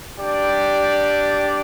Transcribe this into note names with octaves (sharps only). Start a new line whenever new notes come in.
D4 G4 D5 G5